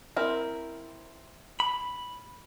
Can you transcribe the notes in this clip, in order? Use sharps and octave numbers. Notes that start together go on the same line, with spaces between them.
C4 E4 A#4
B5